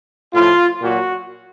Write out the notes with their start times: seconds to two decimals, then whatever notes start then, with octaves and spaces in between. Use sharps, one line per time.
0.34 A2 F3 F4
0.82 A#2 F#3 F#4